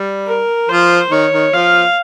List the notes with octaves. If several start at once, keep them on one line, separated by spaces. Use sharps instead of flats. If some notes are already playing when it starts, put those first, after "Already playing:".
Already playing: G3
A#4
F3 C5
D#3 C#5
D#3
F3 F5